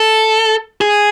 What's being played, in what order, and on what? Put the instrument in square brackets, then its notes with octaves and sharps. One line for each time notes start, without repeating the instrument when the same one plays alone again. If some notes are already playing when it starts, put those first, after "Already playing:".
Already playing: [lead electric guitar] A4
G#4